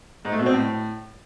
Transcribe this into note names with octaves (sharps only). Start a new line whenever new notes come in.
G#2
A3
B2
C4
A2